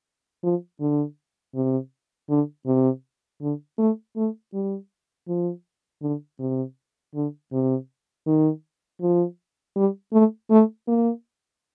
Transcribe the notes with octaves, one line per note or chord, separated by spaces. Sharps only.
F3
D3
C3
D3
C3
D3
A3
A3
G3
F3
D3
C3
D3
C3
D#3
F3
G3
A3
A3
A#3